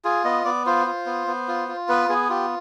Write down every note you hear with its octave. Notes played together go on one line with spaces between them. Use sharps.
F4 G#4
B3 D#5
B3 D5
F4 C5
F4
B3
B3
F4
F4
B3 B4
B3 G#4
F4 G4